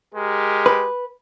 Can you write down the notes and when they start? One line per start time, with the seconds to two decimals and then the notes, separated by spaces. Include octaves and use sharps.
0.13 G#3 G4 A#4
0.66 B4